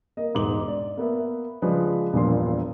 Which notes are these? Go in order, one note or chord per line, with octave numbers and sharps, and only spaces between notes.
A#3 D#5
E1 G#2 B4 D6 F#7
D5
A#3 B3 E5
C#3 F3 G#3 F4 B4 D5
E1 G2 A#2 F3 C6